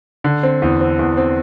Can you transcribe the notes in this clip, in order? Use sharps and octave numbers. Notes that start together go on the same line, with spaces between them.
D3
C4
E2
C4
E2
C4